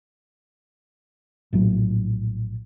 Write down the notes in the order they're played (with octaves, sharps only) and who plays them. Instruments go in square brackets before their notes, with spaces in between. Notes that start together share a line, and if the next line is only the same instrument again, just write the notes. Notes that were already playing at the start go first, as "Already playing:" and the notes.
[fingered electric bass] A#1 A2 F#3